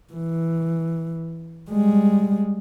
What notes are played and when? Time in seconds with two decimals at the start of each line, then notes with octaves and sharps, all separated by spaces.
0.13 E3
1.71 G3 G#3